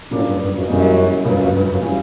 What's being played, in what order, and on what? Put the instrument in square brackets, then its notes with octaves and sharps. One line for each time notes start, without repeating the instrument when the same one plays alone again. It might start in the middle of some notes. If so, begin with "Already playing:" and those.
[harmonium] A2 [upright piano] C#3 F#3 A#3 D4 F4
[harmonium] G2
G2
F#2
[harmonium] F#2 [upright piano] C#3 E3 G3 A#3 D#4
[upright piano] C#2 C#3 F#3 A#3 [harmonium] G2
[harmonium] F#2
G2
F#2
[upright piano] C#3 E3 G3